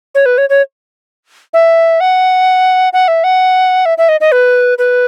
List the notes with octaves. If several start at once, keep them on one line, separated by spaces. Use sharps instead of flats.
C#5
B4
C#5
C#5
E5
F#5
F#5
E5
F#5
E5
E5
D#5
D#5
B4
B4